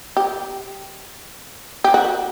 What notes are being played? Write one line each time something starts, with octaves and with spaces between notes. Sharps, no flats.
G4
G4
F#4